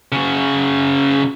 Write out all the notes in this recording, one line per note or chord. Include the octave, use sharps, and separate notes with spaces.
C#3 F#4